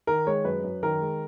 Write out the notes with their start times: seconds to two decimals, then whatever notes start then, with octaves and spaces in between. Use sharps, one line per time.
0.07 D#3 A#4
0.27 G#3 C#5
0.45 F#2 B4
0.64 F#2
0.83 D#3 A#4
1.01 G#3